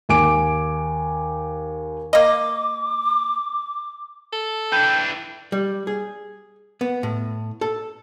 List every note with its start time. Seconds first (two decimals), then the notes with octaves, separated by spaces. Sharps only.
0.09 D#2 G#5 D6 D7
2.13 A#3 D#5 D6
4.33 A4
4.72 E3 D4 G5 G6
5.52 G3
5.87 G#4
6.81 B3
7.03 A2
7.61 A4